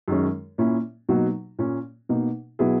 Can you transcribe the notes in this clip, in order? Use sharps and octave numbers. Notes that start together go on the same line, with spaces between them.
F#2 D#3 G#3 C#4
A#2 A#3 C#4 E4
B2 F#3 A#3 D#4 F#4
A#2 A#3 C#4
B2 A#3 D#4
B2 F#3 B3 E4 G#4